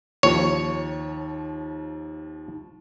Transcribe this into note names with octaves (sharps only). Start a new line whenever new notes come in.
D#2 F3 C#5